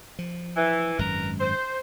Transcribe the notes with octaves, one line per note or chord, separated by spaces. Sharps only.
F3
E3
G#1 F#2 G#3 A#4 B4 A#5
C5